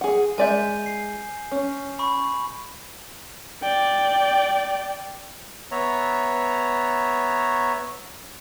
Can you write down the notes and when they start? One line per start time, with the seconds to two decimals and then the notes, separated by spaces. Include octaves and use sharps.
0.01 G#4 F#5
0.38 G#3 D5 E5 G#5 G6
0.86 C7
1.51 C#4
1.99 B5 C#6
3.63 D5 G5
5.71 B3 C#5 E5 A#5